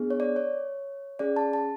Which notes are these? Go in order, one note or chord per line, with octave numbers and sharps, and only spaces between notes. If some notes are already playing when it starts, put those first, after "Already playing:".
Already playing: B3 D4 G#4
C#5
D5
C#5
C#4 G#4 D5
A5
A5